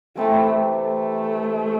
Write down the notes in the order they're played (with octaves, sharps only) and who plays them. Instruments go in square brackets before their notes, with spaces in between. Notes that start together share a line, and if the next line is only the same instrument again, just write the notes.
[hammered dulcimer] C3 E3 C4 [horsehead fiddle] A3
[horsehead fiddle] A3